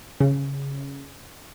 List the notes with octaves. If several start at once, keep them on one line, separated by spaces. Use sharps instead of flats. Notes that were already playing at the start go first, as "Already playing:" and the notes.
C#3